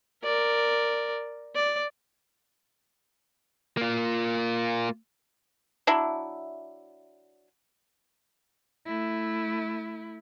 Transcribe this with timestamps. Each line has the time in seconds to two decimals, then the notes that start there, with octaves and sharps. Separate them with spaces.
0.24 A#4 D5
1.55 D5
3.77 A#3 F4
5.87 F#3 D4 E4
8.87 A3 E4